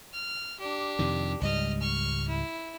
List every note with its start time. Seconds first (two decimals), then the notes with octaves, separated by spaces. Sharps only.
0.13 F6
0.60 D4 G4
0.99 F2 C3 D#3
1.41 C#2 G#2 G3 D#5 F6
1.80 C#6 F6
2.28 E4